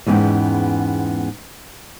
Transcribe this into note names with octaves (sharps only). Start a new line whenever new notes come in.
E2 G#2 B3 C#4 G5